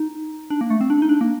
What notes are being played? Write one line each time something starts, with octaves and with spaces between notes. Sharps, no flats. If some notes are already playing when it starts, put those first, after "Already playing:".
Already playing: D#4
D4
A#3
A3
C4
D4
D#4
D4
A#3